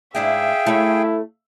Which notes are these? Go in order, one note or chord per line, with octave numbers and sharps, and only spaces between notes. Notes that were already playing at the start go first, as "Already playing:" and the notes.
G#2 D4 E4 G#4 E5 F5 G5
A3 E4 C#5